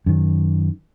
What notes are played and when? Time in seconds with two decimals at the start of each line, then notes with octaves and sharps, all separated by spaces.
0.06 F#2 D#3